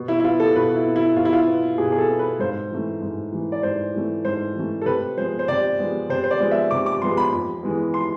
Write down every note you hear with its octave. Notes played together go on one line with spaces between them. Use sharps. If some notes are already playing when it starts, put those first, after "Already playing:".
Already playing: B2
E4
E4
B3 F4
A4
B2 B4
E4
B3
E4
B2 F4
E4
F4
B3
B2 G#4
G#4
A4
B3
B4
G#2 C5
E3 A3
G#2
E3 A3
D5
G#2 C5
E3 A3
G#2 C5
E3 A3
A4
C3 B4
F3 G#3 B3 C5
C5
C3 D5
F3 G#3 B3
C3 C5
C5
D5
F3 G#3 B3
E5
C3 D6
D6
F3 G#3 B3 C6
B5
F2
E3 G#3 B3
C6